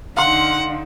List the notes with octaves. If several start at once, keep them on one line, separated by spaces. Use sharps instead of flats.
D3 D#4 F5 F#5 C6